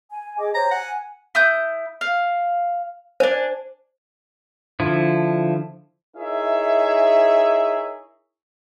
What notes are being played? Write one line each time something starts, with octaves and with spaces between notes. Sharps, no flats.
G#5
G#4 D#5 D6
G4 C5 C#5 A#5
F#5 G#5
E4 D#6 G6
F5
D4 C5 G#5
D3 F3 E4
D#4 E4 G#4 A#4 C#5 E5